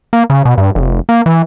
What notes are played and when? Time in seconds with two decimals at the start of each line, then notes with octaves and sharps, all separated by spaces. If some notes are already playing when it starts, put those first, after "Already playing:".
0.13 A#3
0.30 C#3
0.45 B2
0.58 G2
0.75 F1
1.09 A#3
1.26 E3